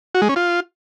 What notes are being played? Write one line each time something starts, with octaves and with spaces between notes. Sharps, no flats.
F#4
G#3
C#4
F4